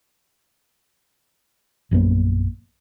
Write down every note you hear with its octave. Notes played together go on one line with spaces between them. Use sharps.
A#1 F#2 A#3 B3